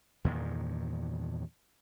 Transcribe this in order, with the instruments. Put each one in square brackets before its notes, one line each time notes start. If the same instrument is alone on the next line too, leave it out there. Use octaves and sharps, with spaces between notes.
[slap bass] E2 G2 A#2 D#3